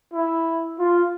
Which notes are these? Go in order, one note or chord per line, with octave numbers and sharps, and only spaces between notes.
E4
F4